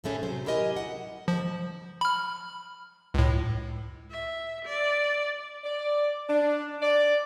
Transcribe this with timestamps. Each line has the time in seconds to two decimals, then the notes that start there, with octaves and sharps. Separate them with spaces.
0.04 F#2 A2 D#3 A3 C#4 G#4
0.23 C3 F#3 C5
0.46 E4 G4 A#4 D#5 G5 G#5
0.76 F#4 F#5
1.28 F3
2.01 B5 F6
3.14 C#2 A2
4.11 E5
4.65 D5
5.64 D5
6.28 D4
6.81 D5